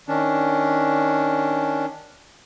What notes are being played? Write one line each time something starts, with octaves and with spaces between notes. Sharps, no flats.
D#3 C#4 D4